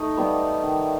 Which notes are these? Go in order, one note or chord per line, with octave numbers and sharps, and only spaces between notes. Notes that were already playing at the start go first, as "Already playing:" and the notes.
Already playing: A3 D#4
G3 B3
D#3